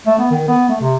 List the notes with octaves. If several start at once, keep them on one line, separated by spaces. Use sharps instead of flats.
A3
B3
D#3
B3
A3
C3